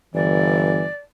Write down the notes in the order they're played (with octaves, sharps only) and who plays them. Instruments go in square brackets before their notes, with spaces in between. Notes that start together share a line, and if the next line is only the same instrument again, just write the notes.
[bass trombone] G1 [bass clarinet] E3 [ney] D5